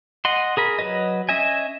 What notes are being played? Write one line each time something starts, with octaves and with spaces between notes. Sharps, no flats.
D#5 F#5 C6
G#4 A#4 B5
F#3 A#4 B4 D#5
C#4 D#5 E5 G#5